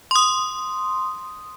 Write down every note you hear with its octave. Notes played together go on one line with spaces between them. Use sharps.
C6 D#6